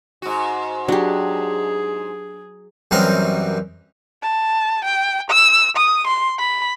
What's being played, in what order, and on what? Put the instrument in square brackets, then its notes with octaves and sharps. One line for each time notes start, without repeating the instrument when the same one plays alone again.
[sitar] G#2 F#4
[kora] F#3 [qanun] D4 G4 [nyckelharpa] G#4
[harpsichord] F#2 E3 G3 C4 A#4 D#5
[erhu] A5
G5
E6
D#6
C6
B5